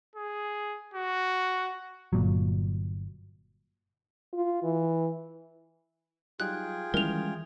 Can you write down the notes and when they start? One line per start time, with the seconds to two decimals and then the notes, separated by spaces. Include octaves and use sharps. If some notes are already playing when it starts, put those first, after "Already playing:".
0.16 G#4
0.94 F#4
2.13 G1 A#2 F#3
4.33 F4
4.63 E3
6.40 F#3 G3 D#4 F4 G#4 G5 F#6
6.94 D#3 E3 G3 G#3 C#4 E4 A#4 F7